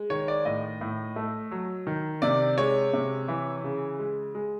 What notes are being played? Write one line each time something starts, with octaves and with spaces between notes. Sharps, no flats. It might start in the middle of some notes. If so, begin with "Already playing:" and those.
Already playing: G#3
D#3 C#5
D5
A2 D#5
A2
A3
F#3
D#3
C3 D5
G#3 C#5
C3
E3
C#3
G#3
G#3